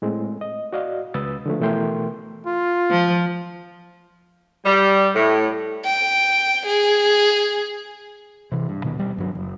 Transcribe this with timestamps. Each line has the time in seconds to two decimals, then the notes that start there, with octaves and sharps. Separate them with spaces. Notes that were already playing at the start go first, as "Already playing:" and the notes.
0.02 A2 G#3 C4
0.41 D#5
0.73 F#4 D5 D#5 F5
1.14 C#2 B4 D#6 E6 A6
1.46 D3 F3 A3
1.60 B2 E3 A3 A#4 G5 C6
2.46 F4
2.90 F3
4.66 G3
5.16 A2
5.85 G5
6.66 G#4
8.52 C3 E3
8.69 G2
8.83 D#1 B2 D#3 B3
8.98 B2 G3
9.16 G1 G2 F#3
9.35 F#1